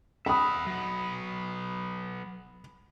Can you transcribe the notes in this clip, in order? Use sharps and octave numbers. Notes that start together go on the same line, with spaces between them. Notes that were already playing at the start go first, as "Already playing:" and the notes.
E5 F#5 B5 D#6
F#3 B3